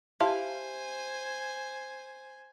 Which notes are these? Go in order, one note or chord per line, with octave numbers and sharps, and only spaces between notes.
E4 G4 C5 F5 G#5 A5 C6